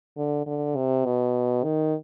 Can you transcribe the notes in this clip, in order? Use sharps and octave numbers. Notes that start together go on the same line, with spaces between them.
D3
D3
C3
B2
D#3